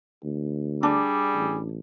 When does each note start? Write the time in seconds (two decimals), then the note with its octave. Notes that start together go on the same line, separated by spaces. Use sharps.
0.24 D2
0.83 G3 D4 G#4
1.35 A1